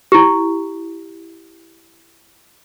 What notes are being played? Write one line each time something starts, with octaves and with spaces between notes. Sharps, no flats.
E4 G4